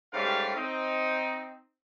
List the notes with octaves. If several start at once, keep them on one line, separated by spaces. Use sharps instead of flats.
G#2 G3 A3 C#4 G4 F5
C4 D#4